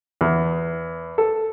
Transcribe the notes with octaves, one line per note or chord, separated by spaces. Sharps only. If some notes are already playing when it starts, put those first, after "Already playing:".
E2
A4